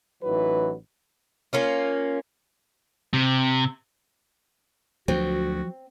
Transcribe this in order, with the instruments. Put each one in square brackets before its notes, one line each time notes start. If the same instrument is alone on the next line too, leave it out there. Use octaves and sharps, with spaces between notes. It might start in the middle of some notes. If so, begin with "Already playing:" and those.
[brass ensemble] A1 E3 F#3 D#4 B4
[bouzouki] A#3 C#4 F4
[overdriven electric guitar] C3
[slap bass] D2 [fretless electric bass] F3 F#3 [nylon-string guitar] C4 [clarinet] F#4